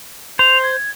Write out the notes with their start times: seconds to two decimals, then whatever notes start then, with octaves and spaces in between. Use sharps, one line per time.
0.39 C5 F7
0.63 G#6